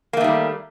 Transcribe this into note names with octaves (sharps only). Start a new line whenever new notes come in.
D#3 G3 A3 A#3